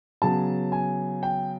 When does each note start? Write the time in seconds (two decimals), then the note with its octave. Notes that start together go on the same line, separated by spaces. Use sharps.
0.22 C#3 F#3 B3 A5
0.72 G#5
1.23 G5